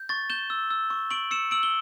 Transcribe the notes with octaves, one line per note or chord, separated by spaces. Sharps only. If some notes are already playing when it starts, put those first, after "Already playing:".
Already playing: G6
C#6 A6
G6 E7 G7
E6
E6
C#6
C#6 D7 F#7
E6 C#7 E7
E6 D7 F#7
G7